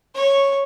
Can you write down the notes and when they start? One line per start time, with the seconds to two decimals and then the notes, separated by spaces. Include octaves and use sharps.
0.15 C#5